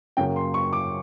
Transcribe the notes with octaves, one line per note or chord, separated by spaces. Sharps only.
F#2 C#3 F#3 A#3 G5
C6
C#6
D6